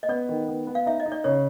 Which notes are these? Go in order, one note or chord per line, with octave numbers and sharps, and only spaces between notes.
D#5
B3 D5
D#3
B3
B3
F5
D#4 E5
D#5
D#4
D5
C#3 C#5